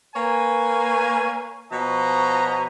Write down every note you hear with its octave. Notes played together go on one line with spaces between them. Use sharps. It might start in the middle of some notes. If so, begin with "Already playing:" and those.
A#3 B4 C#5 G#5
B2 F3 C#5 D#5 A#5